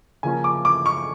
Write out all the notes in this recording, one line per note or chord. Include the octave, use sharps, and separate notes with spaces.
C#3 F3 A#3 C#4 G#5
D6
D6
C#6